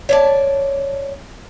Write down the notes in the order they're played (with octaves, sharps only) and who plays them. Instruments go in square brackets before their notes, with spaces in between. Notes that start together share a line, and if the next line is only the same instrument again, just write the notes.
[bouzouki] C#5 D5 A5